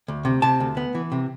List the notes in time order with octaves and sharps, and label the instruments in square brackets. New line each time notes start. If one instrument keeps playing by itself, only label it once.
[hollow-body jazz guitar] D2
C3
C3 A5
D2
B3
E3
C3